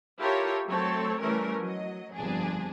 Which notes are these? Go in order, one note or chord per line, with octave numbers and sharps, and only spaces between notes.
E4 F4 G4 A4 A#4 C#5
F#3 A3 C4 A4 C#5
E3 G3 A3 C#4 A#4
F#3 D#5
G1 F2 D4 G#4